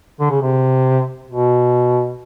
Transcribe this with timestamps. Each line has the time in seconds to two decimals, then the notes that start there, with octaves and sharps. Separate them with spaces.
0.20 D3
0.30 C#3
0.41 C3
1.29 B2